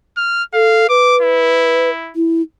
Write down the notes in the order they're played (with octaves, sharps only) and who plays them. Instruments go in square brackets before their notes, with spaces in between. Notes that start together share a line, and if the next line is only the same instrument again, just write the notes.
[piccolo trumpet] F6
[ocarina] A4 [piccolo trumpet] F5
[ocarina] B4 [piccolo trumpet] D6
[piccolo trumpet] E4
[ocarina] E4